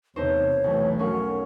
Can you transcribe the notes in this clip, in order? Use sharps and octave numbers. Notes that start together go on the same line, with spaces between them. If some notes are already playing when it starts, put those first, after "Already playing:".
E2 C3 A3 D#4 C5 C#5
B1 E3 A3
F#3 C#4 A#4 F5 F#5